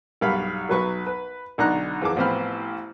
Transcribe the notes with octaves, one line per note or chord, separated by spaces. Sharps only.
B1 G2 F5 B5
B1 F#3 B4 C#6
B4
B1 D3 D#4 A#5 F#6
F2 E3 G#4 A5 D6
A1 F3 B3 C4 B5 F6